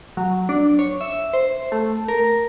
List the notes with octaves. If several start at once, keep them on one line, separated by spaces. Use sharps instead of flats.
F#3
D4
C#5
E5
C5
A3
A#4